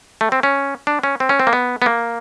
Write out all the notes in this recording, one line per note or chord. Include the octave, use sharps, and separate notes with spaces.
A3
C4
C#4
D4
C#4
C4
C#4
C4
A#3
B3
B3
A#3